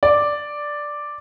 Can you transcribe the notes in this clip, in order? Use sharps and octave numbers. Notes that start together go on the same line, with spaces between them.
D5